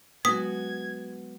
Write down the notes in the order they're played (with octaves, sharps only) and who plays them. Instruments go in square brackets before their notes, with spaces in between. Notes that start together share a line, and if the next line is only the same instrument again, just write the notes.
[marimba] F#3 G#3 [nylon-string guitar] B3 F#4 [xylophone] D#6 B6 [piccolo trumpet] G#6